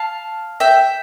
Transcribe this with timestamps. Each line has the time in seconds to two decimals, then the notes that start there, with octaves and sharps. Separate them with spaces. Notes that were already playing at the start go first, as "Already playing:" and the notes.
Already playing: F5 A5
0.60 E5 G5